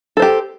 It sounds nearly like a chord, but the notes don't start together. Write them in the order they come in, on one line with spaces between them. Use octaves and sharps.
A4 C5 G4